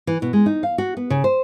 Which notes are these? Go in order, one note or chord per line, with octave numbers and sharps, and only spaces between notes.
E3
B2
G#3
D#4
F5
F#4
B3
C#3
C5